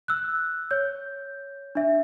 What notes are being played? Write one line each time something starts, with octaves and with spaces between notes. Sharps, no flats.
E6 F#6
C#5 G6
D4 E5